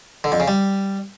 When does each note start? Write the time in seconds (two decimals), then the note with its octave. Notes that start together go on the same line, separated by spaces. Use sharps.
0.24 D3
0.32 F2
0.40 C#3
0.48 G3